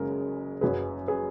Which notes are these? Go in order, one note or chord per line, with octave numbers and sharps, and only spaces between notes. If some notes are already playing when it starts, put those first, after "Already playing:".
Already playing: F#1 F#2 C#3 G#3 A#4
F#1 F#2 C#3 F#3 G#4 B4
G#4 B4